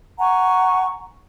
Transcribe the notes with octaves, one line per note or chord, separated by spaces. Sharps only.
F#5 G#5 A#5 C#6